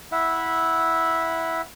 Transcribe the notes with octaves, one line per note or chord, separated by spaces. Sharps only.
E4 E5 F#5